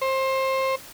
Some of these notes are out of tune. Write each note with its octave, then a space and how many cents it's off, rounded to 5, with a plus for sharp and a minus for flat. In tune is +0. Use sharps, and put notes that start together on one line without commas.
C5 +25